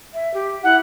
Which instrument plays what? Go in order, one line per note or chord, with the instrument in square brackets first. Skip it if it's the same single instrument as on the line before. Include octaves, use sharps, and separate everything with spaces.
[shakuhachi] E5
G4
[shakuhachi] E4 [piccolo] F#5